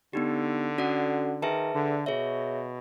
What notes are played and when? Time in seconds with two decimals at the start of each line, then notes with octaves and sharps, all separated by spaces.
0.13 D3 B3 D#4 G4
0.78 C#4 F#4 A4 D5 F#5
1.42 D#3 G#4 B4 E5 A5
1.74 D3
2.06 B2 G#4 C#5 E5